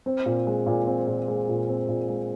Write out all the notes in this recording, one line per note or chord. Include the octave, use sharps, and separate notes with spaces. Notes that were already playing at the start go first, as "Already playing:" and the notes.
C4
A#2
G#3
A#2
C4
A#2
G#3
A#2
C4
A#2
G#3